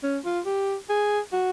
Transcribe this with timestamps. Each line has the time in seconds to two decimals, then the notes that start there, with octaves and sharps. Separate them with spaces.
0.03 C#4
0.25 F4
0.46 G4
0.89 G#4
1.33 F#4